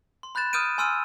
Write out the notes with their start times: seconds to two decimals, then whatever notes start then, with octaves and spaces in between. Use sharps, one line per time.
0.23 C6
0.35 B5 F#6 G6 A6 E7
0.53 D#6 F6 G6 D7 D#7
0.78 G#5 C6 E6 F6 D7 D#7